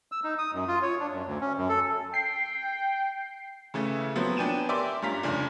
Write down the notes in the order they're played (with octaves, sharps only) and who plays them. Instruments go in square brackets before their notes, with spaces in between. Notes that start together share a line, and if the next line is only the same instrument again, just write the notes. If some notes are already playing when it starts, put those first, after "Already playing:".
[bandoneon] E6
D#4
D#6
F#2
F4
C#5
D4
F#2
D2
C#4
F#2
A4
[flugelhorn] G5 [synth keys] C7
[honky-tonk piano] C#3 E3 A3
F3 F#3 B3 C4
B3 D4 G5 G#5 D#7 E7
G4 A#4 D5 E5 C6 D6
G2 C#4 F4 A#5 B6
F1 C#2 D4